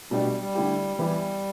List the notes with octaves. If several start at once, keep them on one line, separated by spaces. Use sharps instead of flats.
B2 G3 A3 D4 G4
G3
G3
D3 A3 E4 G4
E3 G3 B3 E4 G4